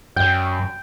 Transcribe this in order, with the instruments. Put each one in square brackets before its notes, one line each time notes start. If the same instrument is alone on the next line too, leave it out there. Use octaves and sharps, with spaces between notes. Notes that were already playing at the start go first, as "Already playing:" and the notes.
[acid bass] F#2 [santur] G5